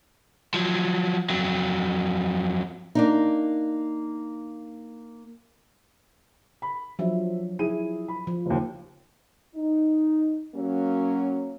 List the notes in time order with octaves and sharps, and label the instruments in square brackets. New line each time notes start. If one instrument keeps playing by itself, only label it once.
[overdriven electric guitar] F3 F#3
F2 F#3
[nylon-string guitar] A#3 D4 D#4
[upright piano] B5
[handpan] F3 F#3 D4 [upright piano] E5
[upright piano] E4 G#4 D#7
B5
[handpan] F3
[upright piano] F#1 D#2
[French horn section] D#4
F#3 A#3 C#4